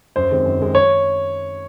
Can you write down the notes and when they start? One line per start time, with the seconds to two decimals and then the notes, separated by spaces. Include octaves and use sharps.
0.16 F#2 C5
0.31 D#3 G#3 C4
0.45 F#2
0.60 D#3 G#3 C4
0.75 C#5